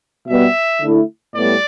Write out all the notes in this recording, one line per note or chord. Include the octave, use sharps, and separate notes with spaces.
B2 G3 B3 E5
D3 A3 E4 A4
A2 G3 B3 D5